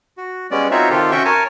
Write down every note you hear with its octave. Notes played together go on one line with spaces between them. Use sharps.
F#4
G3 G#3 B3 C#4 D5
C4 D#4 F4 F#4 C#5 E5
C3 D#3 F4 G4 A4
C#4 F#4 E5 G5 C#6
A#4 C#5 G#5 A5